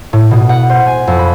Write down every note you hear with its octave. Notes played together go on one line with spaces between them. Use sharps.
A2
B2
F#5
C5
G#5
F2
B5